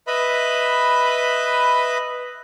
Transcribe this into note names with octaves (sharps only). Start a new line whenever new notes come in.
B4 D#5 E5 B5